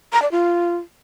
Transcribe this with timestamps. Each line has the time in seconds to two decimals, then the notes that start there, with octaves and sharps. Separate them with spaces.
0.13 A#5
0.22 D5
0.31 F4